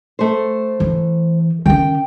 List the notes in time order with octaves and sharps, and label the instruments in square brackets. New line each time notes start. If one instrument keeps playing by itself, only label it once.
[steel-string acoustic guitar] A3 C5
[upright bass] E3
[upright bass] D#3 C#4 [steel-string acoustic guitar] G5